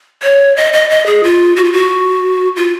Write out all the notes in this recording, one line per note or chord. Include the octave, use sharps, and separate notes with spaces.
C#5
D#5
D#5
D#5
G#4
F4
F#4
F4
F#4
F4